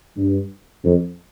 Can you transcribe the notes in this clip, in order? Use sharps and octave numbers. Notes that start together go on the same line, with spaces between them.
G2
F2